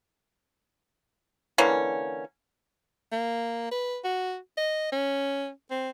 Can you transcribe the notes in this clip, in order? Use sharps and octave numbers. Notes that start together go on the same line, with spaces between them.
D3 E3 A#3 C#4
A#3
B4
F#4
D#5
C#4
C4